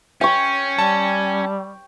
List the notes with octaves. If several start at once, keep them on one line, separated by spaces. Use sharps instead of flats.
C#4 G5 C#6
G3 A5